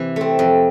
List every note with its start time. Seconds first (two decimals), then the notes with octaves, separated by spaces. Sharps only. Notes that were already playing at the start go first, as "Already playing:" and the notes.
Already playing: C3 E3
0.16 A3 C4
0.39 F2